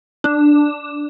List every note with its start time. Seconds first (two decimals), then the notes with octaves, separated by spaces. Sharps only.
0.24 D4